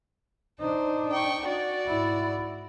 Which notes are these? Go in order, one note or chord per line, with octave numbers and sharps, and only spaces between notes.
D4 D#4 C5
G5 C#6
F#4 D5
G#2 E4